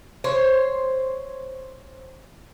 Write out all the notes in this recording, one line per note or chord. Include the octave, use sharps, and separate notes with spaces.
C5 C#5